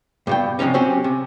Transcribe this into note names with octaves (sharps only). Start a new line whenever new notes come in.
G2 B2 G5
F#2 C3 F3 C#4 D#4
F#3 C4 C#4 G4
C3